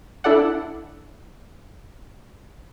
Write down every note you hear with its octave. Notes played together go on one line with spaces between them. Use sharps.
D4 E4 A4 D5 F#5